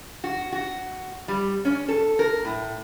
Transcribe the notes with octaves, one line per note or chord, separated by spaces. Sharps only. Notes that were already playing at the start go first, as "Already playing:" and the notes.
F#4
F#4
G3
C#4
A4
A#4
A2